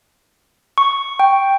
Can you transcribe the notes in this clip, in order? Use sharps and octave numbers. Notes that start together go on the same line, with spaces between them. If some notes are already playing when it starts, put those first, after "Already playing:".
C#6
G5